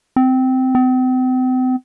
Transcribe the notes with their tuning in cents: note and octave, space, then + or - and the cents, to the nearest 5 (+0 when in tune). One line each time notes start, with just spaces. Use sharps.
C4 -15
C4 -40